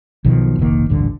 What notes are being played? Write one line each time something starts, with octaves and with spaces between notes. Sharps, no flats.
B1 B2 D#3 F3
F1 A#1 D#3 A#3
D#1 A1 G2 D3